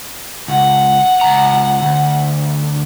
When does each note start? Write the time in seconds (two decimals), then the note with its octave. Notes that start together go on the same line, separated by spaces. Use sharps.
0.48 C#2 F#5
1.21 C#2 A#5
1.82 D2